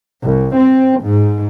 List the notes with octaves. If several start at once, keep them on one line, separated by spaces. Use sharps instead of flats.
C2
C4
G#2